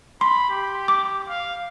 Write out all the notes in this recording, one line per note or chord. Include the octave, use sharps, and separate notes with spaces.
B5 C6
G4
D6
F5